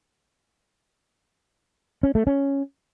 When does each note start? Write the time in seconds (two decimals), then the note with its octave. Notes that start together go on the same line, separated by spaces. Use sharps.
2.03 C#4
2.15 A3
2.27 C#4